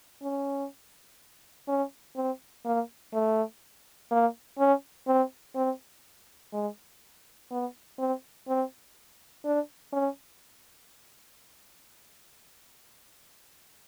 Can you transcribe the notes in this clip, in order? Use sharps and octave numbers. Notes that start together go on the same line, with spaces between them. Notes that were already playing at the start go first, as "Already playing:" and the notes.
C#4
C#4
C4
A#3
A3
A#3
C#4
C4
C4
G#3
B3
C4
C4
D4
C#4